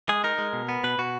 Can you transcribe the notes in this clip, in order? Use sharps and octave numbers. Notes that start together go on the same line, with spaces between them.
G#3 G#4
D#4 A#4
G#3
B2
B3
B2 B4
B2 F#4